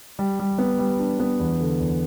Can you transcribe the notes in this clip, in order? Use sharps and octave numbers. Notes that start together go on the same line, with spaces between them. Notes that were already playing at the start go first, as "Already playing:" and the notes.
G3
G3
B3
G3
D4
B3
E2
D3
E2